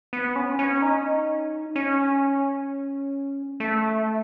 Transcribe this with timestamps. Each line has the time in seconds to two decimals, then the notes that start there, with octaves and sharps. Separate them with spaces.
0.13 B3
0.36 C#4
0.59 C#4
0.82 D#4
1.76 C#4
3.60 A3